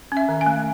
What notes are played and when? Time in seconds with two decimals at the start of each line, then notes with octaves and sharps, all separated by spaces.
0.12 C#4 E5
0.29 D#3
0.41 G#5
0.46 A3